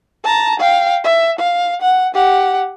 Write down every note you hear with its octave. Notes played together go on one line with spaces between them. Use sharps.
A5 A#5
F5 G5
E5
F5
F#5
G4 F#5